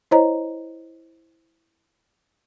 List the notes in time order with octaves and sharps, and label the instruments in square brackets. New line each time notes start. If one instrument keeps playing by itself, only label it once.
[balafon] E4 C5 C#5 D#5 A#5